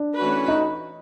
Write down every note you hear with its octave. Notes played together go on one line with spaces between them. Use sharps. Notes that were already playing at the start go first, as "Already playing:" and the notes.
Already playing: D4
E3 A3 C#4 F#4 B4
D#4